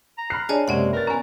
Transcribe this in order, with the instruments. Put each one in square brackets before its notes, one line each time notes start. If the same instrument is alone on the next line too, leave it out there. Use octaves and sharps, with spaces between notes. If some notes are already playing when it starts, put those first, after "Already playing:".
[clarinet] A#5
[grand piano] B5 F6 F#6 [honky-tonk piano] C7
[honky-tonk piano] D4 G#4 [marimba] C#5 D#5 A5
[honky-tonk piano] F#1 [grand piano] C3 [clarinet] G#3 [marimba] C#4 D5 F#5
[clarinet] A#4 [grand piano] B4 A6
[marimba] B3 C#4 [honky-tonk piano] G#5 A#5